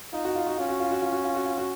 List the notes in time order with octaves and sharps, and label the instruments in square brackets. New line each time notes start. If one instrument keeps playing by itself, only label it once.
[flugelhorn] D#4 [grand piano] F4
[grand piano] F#4
F4
F#4
[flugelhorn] C#4 [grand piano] F4
[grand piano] F#4
F4
F#4
F4
F#4
F4
F#4
F4
F#4